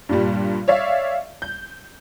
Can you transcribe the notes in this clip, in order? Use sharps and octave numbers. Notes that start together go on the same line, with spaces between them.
G2 A#2 G3
C#5 D5 E5 F5
G6